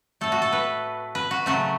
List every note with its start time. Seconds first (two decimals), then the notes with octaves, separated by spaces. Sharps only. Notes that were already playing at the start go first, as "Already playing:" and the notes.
0.21 A2 A3 A4
0.32 F#4
0.42 A4
0.52 B4
1.15 B4
1.31 F#4
1.46 C#3 F#3 A3 F#4